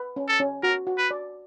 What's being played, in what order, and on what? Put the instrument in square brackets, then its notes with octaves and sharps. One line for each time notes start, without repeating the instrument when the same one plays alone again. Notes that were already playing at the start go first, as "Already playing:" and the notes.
Already playing: [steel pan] B4
C#4
[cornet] A4
[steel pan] C#4
[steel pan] F#4 [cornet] A#4
[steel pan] F#4
[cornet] B4
[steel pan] D5